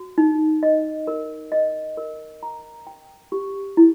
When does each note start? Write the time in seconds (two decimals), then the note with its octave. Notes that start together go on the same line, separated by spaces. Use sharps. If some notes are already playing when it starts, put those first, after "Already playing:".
Already playing: F#4
0.18 D#4
0.63 D#5
1.07 A#4
1.52 D#5
1.97 A#4
2.43 A#5
2.87 G5
3.32 G4
3.77 E4